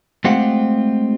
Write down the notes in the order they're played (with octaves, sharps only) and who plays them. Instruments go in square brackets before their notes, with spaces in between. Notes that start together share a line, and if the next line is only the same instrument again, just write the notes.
[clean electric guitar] G#3 A3 C4 F4 G4 F#5